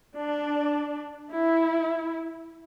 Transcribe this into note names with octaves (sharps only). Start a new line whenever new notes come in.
D4
E4